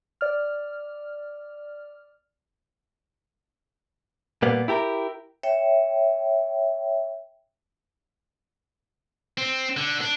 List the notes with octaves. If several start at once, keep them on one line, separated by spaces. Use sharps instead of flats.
D5 F6
A#2 G3 A#3 B3
E4 G4 A4 A#4
C#5 E5 G5
C4
D3
D4